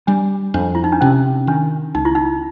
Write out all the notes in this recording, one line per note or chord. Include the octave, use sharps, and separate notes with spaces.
G3 D4
F2 D4
E4
D#4
D4
C3 C#4
D#3 D4
C#2 D#4
E4
D#4